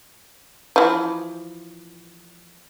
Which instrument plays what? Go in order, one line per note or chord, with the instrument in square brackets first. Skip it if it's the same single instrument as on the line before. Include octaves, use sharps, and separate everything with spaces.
[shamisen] E3 F3